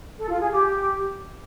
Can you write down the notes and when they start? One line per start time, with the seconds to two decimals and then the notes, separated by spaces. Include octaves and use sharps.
0.19 A4
0.29 F4
0.40 G#4
0.50 G4